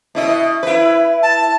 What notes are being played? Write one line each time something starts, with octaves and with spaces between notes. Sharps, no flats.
B2 E4 D#5
E4 B4
A5